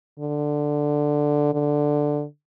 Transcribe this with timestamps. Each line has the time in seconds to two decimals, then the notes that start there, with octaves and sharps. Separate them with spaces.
0.20 D3
1.54 D3